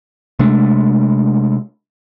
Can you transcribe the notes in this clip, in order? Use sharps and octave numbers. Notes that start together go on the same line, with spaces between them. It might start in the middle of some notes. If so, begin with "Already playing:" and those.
C3 G#3 A3 D4